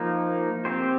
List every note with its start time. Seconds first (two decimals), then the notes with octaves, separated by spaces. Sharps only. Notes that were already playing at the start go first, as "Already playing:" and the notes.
Already playing: F3 A#3 D#4
0.65 C4 G4 C5